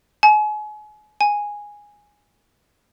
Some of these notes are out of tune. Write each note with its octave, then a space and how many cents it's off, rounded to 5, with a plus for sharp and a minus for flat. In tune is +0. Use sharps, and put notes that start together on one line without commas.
G#5 +35
G#5 -5